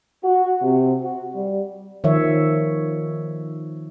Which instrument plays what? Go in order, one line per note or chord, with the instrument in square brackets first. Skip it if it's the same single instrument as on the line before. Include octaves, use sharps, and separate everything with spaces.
[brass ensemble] F#4
C3
F#4
G3
[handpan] D#3 F3 C#5 E5